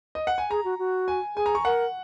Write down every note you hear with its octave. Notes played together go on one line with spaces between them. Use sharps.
D#5
F#5
G#5
G#4 A#5
F#4
F#4
G#5
G#4 G#5
A#5
C#6
A#4 F#5